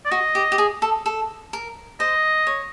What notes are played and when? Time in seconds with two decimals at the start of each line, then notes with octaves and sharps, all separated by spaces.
0.06 D5
0.11 F#4 D#5
0.35 G4
0.52 G4
0.58 G#4
0.82 A4
1.06 A4
1.53 A#4
2.00 C5 D#5
2.47 C#5